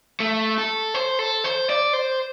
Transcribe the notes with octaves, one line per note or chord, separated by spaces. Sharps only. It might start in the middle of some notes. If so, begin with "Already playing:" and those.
A3
A4
C5
A4
C5
D5
C5